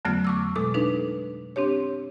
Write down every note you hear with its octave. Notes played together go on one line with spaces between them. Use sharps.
F2 D3 F#3 A3 B3 F6
C#6 D6 E6
B2 G#3 A4 D6
D4 D#4 B4
C4 D4 G4 C#5